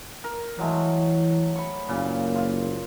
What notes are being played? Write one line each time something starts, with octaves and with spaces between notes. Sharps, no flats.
A#4
E3 F#3 G#3 A3
B5 C#6
F#1 A#2 C#3
F4 F5